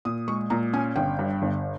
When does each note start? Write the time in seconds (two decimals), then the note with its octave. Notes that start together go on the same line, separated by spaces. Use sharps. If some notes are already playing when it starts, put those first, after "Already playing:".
0.05 A#2 D#6
0.28 G#3 C#6
0.50 A#2 A#5
0.73 C#4 G#5
0.96 G1 G5
1.19 G2
1.42 G1